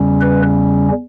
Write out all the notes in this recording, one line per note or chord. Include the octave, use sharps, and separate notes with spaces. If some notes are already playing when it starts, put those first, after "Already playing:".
Already playing: E2 C#3 G3 C#4
B4